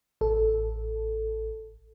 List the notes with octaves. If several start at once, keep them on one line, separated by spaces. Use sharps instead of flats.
A1 A4